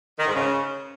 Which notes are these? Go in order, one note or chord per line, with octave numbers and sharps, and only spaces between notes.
D#3
G#2
C#3